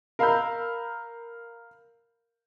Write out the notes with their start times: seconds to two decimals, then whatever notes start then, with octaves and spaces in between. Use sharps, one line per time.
0.19 A#4 F5 A#5 B5 E6 G6